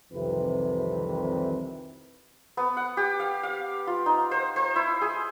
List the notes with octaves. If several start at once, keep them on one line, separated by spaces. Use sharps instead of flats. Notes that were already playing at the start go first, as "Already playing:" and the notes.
C2 F2 C3 D#3 E3 B4
B3
F#5
G4
F5
F5
F4
D#4
C5
C5
E4
G#4